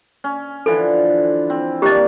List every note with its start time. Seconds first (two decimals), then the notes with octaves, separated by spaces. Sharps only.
0.24 C#4
0.66 D3 E3 F3 A4
1.50 C4
1.82 D#3 A#3 D4 G4 D#5